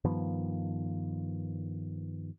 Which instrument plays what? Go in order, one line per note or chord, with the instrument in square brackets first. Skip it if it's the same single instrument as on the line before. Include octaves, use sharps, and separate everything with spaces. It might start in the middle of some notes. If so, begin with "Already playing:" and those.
[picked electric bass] G2 D#3 F3 B3